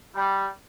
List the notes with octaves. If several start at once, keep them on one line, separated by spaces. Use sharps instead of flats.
G3